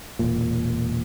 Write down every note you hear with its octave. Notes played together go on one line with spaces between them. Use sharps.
E1 A#2